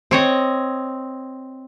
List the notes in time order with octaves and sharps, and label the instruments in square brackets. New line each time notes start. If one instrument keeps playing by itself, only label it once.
[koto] C4 C#5 D#5